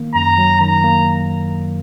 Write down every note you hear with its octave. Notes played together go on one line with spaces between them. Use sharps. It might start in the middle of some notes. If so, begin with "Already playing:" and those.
Already playing: D#3 A#3
F#2 A#5
F#3
D#3 A#5
A#3